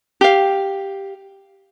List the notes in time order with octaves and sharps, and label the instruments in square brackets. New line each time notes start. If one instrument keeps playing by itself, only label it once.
[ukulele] G4 F5